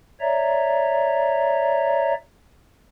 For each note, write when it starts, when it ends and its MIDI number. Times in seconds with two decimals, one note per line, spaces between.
0.21 2.14 73
0.21 2.14 74
0.21 2.14 76
0.21 2.14 82